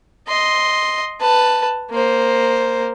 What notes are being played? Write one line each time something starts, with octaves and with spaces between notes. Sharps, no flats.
D#5 C6
B4 A5
A#3 C5